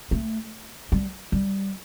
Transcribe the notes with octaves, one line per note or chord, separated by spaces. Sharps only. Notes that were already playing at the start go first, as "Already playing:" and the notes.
A3
G3
G3